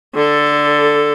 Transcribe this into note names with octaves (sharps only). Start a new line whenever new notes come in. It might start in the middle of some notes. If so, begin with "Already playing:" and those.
D3 A4